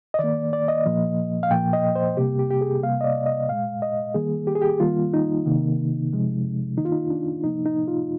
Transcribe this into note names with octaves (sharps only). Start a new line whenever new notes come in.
D#5
D#3 A#3 D5
D5
D#5
A#2 F3 A#3
F5
A#2 F3 A#3 G5
D#5
C5
C3 G3 A#3 G4
G4
G4
G#4
C3 G3 A#3 F5
D#5
D5
D#5
A#2 G#3 F5
D#5
D#3 G3 A#3 G#4
G4
G#4
G4
D#3 G3 A#3 F4
D#4
C3 D#3 A#3
C3 F3 G#3
D#3 A#3 D#4
F4
D#4
D4
C3 F3 A#3 D#4
D#4
F4